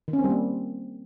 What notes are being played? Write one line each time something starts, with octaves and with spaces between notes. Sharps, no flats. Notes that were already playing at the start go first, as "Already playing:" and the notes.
D#3
C#4
C4
G3
A#3